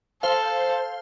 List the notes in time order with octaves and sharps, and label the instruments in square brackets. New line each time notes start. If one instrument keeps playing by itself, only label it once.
[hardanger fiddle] A4 [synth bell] C5 F5